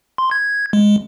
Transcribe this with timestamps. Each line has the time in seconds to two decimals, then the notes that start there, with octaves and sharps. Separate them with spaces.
0.18 C6
0.31 G#6
0.73 G#3